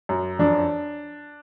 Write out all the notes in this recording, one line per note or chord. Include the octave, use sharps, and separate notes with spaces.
F#2
F2 D4